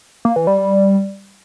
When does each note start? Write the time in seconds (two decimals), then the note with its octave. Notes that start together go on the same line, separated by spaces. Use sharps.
0.25 A#3
0.36 E3
0.47 G3
0.58 G3